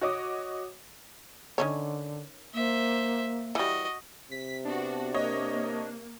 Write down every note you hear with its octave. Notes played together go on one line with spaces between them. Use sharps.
F#4 C#5 D#5 D6 D#6
D3 D#3 C#4 C#5
A#3 C5 E5
E3 G3 F#4 D#5
C3 B6
B3 D4 F#4
A#3 C#5 D#5